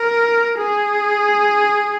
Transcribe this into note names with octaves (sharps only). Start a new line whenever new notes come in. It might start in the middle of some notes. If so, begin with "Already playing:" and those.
Already playing: A#4
G#4